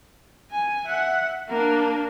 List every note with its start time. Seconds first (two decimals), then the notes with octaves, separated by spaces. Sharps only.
0.51 G#5
0.85 E5 F#5
1.48 A#3 D4